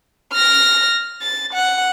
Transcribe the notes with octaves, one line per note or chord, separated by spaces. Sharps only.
F6 A#6
A6
F#5